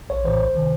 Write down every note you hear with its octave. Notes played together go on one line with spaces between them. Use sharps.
A#1 C#5
A2 E3 C5
C#2
C3 D#3